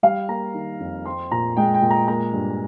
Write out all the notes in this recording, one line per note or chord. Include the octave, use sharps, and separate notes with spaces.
G3 F5
A#3 A#5
D#3
F2
C4 C6
A#2 A#5
G#3 G5
G5
A#2
A#5
A#3 A#5
G2